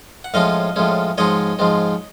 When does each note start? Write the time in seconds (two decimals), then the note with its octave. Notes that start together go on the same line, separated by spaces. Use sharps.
0.24 F#5
0.34 A2 F3 G#3 C#4 D#5 F5
0.76 A2 F3 G#3 C#4
1.18 G#2 F3 G#3 C4 C#5 D#5
1.59 G#2 F3 G#3 C4